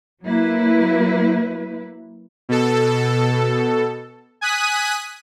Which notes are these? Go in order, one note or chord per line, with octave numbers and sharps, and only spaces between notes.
F#3 A#3 E4 B4
B2 A4
G#5 D#6 F#6 B6 D#7